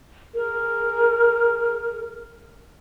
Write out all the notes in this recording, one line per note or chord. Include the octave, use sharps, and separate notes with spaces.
G#4 A#4